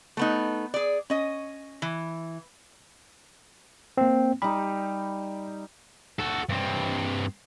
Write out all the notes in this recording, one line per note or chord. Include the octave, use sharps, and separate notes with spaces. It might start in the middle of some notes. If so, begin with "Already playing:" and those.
A3 B3 D#4
G#4 D5
C#4 D#5
E3
A#3 C4
G3 D#4 B5
F#4 A4
G2 C4